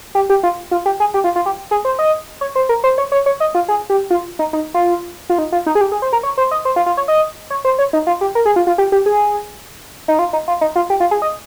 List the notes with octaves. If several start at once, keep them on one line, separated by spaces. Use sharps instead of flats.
G4
G4
F4
F4
G4
G#4
G4
F4
F4
G4
G#4
C5
D#5
C#5
C5
A#4
C5
C#5
C#5
C#5
D#5
F4
G#4
G4
F4
D#4
D#4
F4
F4
D#4
F4
D#4
G#4
G4
G#4
C5
A#4
C#5
C5
D#5
C5
F4
F4
C#5
D#5
C#5
C5
C#5
D#4
F4
G4
A#4
G#4
F4
F4
G4
G4
G#4
D#4
F4
D#4
F4
D#4
F4
G4
F4
G#4
D#5